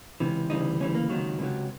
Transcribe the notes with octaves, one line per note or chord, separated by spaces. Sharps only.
C#2 C3 E3
D2 C#3 E3 G3 D#4
D2 C#3 E3 G3 C#4
A#3
C#2 C3 D#3 F#3
C#2 C3 D#3 F#3